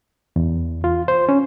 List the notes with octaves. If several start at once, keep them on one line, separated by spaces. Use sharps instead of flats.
E2
F4
C5
C#4